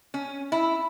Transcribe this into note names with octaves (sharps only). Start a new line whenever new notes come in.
C#4
E4